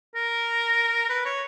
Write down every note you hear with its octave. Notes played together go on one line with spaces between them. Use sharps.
A#4
B4
C#5